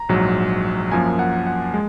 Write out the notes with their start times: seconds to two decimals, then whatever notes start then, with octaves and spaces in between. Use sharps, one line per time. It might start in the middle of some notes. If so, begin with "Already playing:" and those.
Already playing: A#5
0.09 A#1 G#2 F#3
0.92 F#2 F3 A#3 G#5
1.19 F#5
1.47 F#5
1.74 G#3